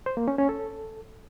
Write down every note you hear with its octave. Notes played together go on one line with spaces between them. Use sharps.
C5
A#3
C#4
C#4
A4